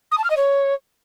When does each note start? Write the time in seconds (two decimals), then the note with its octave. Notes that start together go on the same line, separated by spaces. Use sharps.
0.11 D#6
0.18 A5
0.24 F6
0.30 D#5
0.36 C#5